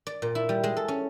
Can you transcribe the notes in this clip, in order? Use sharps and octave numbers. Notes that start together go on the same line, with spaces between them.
D5
A#2
E4
G3
G#3
A4
C#4